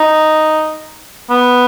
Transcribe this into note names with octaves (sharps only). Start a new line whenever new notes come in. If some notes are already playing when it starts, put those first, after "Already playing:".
Already playing: D#4
B3